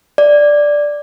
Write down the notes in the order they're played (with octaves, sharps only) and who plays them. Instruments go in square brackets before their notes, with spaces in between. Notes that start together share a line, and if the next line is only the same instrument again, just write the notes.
[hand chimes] D5